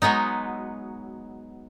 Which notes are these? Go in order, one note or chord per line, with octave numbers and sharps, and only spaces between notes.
F#3 G#3 B3 D#4